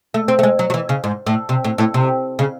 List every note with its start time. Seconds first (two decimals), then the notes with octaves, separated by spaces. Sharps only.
0.14 A3
0.28 C4
0.39 A3
0.43 G#3
0.59 F#3
0.70 F#3
0.74 E3
0.89 C#3
1.04 G#2
1.27 A2
1.49 C3
1.64 A2
1.78 A2
1.94 C3
2.39 C#3